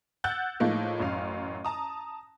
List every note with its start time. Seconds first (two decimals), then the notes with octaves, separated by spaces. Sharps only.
0.24 F#5 E6 F#6 G6 A6
0.60 A2 F3 G#3 A#3 D#4
1.00 A1 F#2 F5
1.65 A5 A#5 D#6